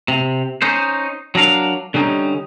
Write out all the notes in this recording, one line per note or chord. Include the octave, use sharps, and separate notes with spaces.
C3
C#4 D#4 C5
F#3 D4 A#4 F5
D3 G3 C#4 D#4